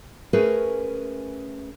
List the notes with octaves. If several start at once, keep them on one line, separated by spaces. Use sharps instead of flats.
A3 C#4 G#4 A#4 B4